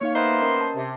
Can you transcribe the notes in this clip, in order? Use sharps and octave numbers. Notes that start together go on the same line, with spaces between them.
A#3 D#4 C#5 F5
A#3 B3 C5 D#5 E5 A#5
C#4 A#4 D#5
A5
C3